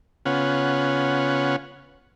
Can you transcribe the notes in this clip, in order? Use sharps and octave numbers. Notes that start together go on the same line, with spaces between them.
C#3 B3 C#4 F4 F#5